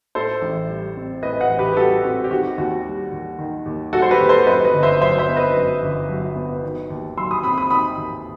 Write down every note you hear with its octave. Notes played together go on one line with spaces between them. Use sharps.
A2 A4 C5
A1
G3
C4
A2 B4 D#5
D#5 F#5
A1
G4 B4
G4
G3 F#4 A4
C4 F#4
G4
D#3 F#4
D#2 F#4
G3
D#2
D#3
D#2
G3 F#4 A4
C5
G4 B4
D#2
A4 C5
F#2 B4 D#5
B4 D#5
G1
C5 E5
F#3 C5 E5
C5 E5
B3
B4 D#5
F#2
G1
F#3
B3
D#3
D#2
F#3 C6 E6
B5 D#6
C4 B5 D#6
B5 D#6
D#3 B5 D#6
D#2